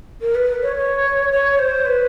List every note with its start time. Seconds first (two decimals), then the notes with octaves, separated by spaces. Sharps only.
0.21 A#4
0.34 B4
0.62 C#5
0.76 C#5
1.30 C#5
1.58 C5
1.85 B4